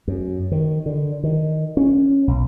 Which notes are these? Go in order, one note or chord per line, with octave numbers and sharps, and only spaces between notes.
F#2
D#3
D3
D#3
C#4
B1